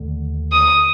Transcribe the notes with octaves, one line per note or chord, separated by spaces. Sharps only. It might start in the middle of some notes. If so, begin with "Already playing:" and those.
Already playing: D#2 D3 A3
D#6